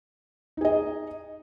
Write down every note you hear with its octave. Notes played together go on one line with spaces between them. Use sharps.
D#4 G#4 D#5